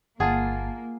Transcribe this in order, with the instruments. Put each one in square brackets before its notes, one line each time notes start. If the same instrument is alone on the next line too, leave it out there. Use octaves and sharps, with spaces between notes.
[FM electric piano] G1 A5 [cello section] A#3 [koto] F4 G#4 [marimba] F#5